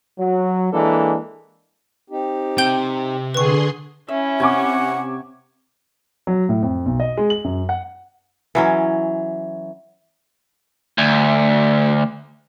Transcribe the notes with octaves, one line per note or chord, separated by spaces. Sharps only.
F#3
E3 G#3 A#3 D4 A4
C4 D#4 G4
C3 G5 G6 G7
D3 G#4 B4 C6 C#6
C#4 E4 E5
C3 F#5 G#5 C#6 D6
F#3
A2
F2
B1
D#5
G#3
F#7
F#2
F#5
E3 F#3 C#4
D2